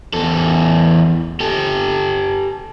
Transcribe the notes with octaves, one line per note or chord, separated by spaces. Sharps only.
E2 A4
G4 A4